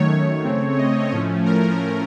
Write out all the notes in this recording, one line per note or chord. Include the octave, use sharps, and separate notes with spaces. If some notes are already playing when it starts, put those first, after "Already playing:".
Already playing: F#2 D#3 A3 C#5
C#5
C#3 A3 C4
D#5
A2 F3 A3 C#4
A#4